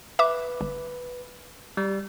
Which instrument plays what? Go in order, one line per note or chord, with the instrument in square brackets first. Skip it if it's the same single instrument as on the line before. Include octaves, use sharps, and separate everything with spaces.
[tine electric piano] B4 [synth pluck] E5 D6
[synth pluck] G1
[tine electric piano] G3